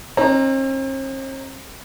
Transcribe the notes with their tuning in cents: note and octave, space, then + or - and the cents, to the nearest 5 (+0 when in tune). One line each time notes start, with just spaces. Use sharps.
C4 +45 D#4 -25 A#5 +0